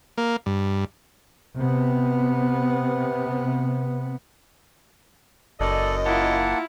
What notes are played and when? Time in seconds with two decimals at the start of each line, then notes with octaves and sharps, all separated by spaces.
0.18 A#3
0.46 G2
1.56 C3 B3
5.60 F#1 F#2 A4 D5 D#5
6.05 A#3 E4 F4 F#5 A5